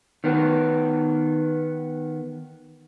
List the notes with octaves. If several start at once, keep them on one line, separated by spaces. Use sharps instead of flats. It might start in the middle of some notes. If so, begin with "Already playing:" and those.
D#3 B3